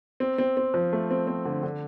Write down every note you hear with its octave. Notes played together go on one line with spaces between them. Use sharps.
C4
C4
C4
F3
A3
C4
C4
D3
D3